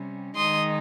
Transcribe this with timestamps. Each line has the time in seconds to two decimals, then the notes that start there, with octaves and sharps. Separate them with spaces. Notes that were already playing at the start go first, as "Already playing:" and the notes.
Already playing: C3 G3 C#4
0.36 D#3 G#3 D#4 C6 D#6